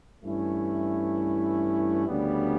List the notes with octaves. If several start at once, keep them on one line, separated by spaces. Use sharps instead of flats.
G2 E3 A3 C#4 E4
D2 C#3 G3 B3 D4